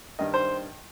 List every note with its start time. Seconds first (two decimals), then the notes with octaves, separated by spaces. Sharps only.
0.19 G2 D#3 D#5
0.34 C5